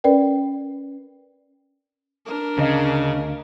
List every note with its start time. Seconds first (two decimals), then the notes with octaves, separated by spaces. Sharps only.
0.04 C#4 A#4 B4 D5 G5
2.26 D4 A#4
2.58 D2 C#3 D#5 F5